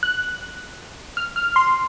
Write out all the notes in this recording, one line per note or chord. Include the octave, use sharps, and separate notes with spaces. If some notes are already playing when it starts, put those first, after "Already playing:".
F#6
F6
F6
C6